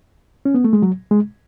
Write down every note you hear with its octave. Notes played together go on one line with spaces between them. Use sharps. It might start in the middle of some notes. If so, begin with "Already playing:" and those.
C#4
B3
A3
G#3
F#3
G#3